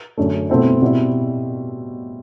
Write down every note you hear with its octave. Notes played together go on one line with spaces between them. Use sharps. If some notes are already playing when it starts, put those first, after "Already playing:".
F#2 D3 A3
B2 A3 C4 E4
B2 G3 C4 E4